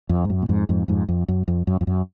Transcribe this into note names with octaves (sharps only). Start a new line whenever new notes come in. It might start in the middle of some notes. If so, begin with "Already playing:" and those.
F2
G#2
F#2
A#2
F2 G#2
F2 G#2
F2 G#2
F2
F#2
F2
F#2
F2
F#2